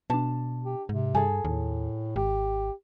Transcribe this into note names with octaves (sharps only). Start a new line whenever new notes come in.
B2 D4 A5
G4
G#2 C3
G2 G#4 A4 G#5
D#2 A2
G#1 G4